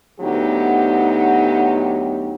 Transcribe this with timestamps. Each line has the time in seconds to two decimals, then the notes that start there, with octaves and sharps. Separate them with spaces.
0.20 D2 F#3 B3 D#4 G4